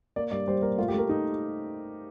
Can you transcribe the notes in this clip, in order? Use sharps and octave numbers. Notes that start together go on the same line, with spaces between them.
A#3 D5
G2 D5
G3 C5
A#3 A#4
A3 F4
G4
A3 A#4
D#4